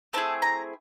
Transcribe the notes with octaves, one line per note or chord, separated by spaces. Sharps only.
A3 C4 E4 G#4 A5
A#5